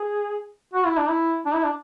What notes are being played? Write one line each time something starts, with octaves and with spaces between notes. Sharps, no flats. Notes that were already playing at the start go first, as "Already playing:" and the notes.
Already playing: G#4
F#4
E4
D4
E4
D4
E4
D4